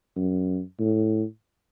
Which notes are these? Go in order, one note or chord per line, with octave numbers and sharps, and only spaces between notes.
F#2
A2